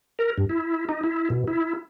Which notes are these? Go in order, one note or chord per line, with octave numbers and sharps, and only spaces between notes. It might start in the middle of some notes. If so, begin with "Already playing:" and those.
A#4
G2
E4
D#4
E4
B2
E4